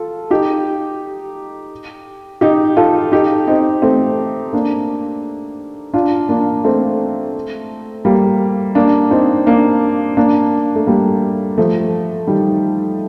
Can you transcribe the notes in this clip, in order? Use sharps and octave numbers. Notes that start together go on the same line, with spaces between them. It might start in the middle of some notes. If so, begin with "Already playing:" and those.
Already playing: F4 A4
D#4 G4
D#4 G4
F4 A4
D#4 G4
C4 D#4
A3 C4
A#3 D4
D4 F4
A#3 D4
A3 C4
G3 A#3
A#3 D4
C4 D#4
A#3 D4
A#3 D4
A3
G3 A#3
F3 A3
D#3 G3